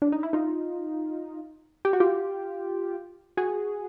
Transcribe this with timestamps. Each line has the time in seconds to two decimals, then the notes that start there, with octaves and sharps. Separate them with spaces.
0.02 D4
0.12 D#4
0.23 E4
0.33 D#4 F4
1.85 G4
1.93 F#4
2.00 F4 G4
3.37 F#4 G#4